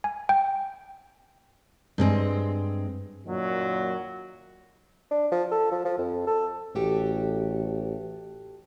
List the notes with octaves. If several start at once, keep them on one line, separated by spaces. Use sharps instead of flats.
G#5
G5
G2 G#3 C4
F#2 A#2 D#3 F#3
D4
F3
A4
F3
F3
F2
A4
A1 F#4 G4 A4